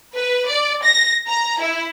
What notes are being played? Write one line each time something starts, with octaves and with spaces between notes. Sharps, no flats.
B4
D5
A#6
A#5
E4